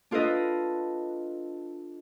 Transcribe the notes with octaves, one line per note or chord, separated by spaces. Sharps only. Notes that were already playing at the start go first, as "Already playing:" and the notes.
D4 F4 A4 B4 D#5